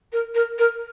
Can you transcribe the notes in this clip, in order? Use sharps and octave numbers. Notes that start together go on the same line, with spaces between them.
A#4
A#4
A#4